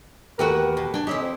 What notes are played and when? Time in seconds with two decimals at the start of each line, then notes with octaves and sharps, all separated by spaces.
0.39 D#2 E3 A3 F#4 G4 A#4 B4 F#5
0.77 B2
0.94 D4 G5 G#5
1.07 C4 C#4 D#4 E4 G4 G#4 D#5
1.21 F2